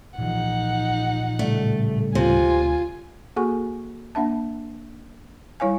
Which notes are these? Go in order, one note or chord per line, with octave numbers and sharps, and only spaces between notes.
A#2 E3 F3 D#4 F#5
A2 C#3 G3 A3
D2 C3 F4 G#5
A#3 F#4 G#4 A4 G#5 C#6
A#3 D4 E5 A5
G3 E4 C#5 F5 G#5